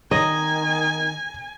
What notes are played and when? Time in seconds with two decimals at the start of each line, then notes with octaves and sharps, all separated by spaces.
0.11 D#3 D#5 G#5 A#5